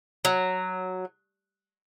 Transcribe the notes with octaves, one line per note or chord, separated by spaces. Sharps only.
F#3